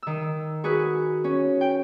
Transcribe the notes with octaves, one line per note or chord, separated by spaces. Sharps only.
D#3 E6
F#4 G#4 B4
C#4
G5